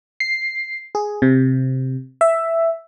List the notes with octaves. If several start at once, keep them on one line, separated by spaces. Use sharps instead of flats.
C7
G#4
C3
E5